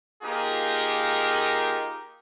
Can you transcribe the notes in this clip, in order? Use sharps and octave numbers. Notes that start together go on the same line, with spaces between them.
A#3 D#4 F4 G4 G#4 A#4